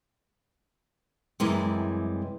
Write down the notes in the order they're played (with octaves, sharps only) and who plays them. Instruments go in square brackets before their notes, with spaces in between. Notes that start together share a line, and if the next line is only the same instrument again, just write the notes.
[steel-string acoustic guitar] F#2 C3 E3 G3 G#3